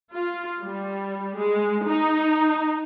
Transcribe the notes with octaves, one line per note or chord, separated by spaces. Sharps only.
F4
G3
G#3
D#4